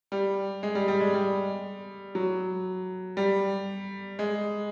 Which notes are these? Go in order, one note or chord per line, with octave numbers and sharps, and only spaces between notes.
G3
G#3
G3
G3
G#3
G3
F#3
G3
G#3